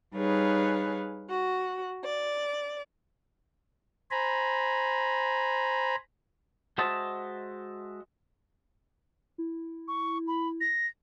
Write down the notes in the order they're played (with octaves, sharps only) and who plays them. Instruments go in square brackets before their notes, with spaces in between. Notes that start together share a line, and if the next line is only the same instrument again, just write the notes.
[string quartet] G3 D#4 G#4 B4 C#5 F5
F#4
D5
[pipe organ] C5 G#5 A#5 B5
[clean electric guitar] G#3 F#4 C5 D#5 E5 A5
[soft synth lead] E4
[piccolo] C#6
B5
A#6